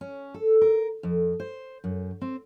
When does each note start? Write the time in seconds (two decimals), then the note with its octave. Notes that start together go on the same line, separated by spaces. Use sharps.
0.01 C#4
0.34 A4
0.61 A#4
1.03 F2
1.40 C5
1.84 F#2
2.21 C4